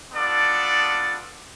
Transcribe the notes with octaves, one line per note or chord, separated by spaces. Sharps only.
B3 D4 F4 A4 D5